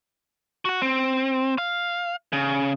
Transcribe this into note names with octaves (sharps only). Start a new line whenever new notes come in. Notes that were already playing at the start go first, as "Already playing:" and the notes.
F#4 F#5
C4
F5
C#3